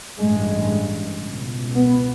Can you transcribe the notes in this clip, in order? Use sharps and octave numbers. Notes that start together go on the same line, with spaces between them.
A1 G2 G#3
C#2 B2
B3